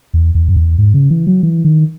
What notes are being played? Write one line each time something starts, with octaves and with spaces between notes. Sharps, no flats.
E2
E2
F#2
E2
G#2
C#3
E3
F#3
E3
D#3